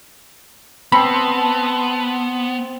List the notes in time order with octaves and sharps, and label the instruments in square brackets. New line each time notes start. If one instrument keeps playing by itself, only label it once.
[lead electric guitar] B3 [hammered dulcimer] C4 C6 [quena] A5 [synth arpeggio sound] B5